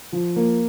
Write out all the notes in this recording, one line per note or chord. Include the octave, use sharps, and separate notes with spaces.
F3
A#3